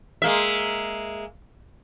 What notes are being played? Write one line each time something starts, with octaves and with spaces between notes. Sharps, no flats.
G#3 A#3 E5